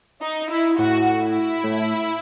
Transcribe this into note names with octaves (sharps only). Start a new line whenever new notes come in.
D#4
E4
A2 F#4
E4
A2